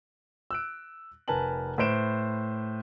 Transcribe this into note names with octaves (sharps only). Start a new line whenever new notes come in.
E6 F#6 D7
F1 A#4 B4 G#5 A5 F#7
A2 B4 C5 D7 E7